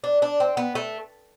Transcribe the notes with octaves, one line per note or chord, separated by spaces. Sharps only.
D4
D4
C4
B3
A3